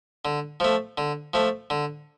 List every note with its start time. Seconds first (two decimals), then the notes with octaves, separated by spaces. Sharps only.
0.25 D3
0.60 F3 A3
0.98 D3
1.33 F3 A3
1.70 D3